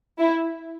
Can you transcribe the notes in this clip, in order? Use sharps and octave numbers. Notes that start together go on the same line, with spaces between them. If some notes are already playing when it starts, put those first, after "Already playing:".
E4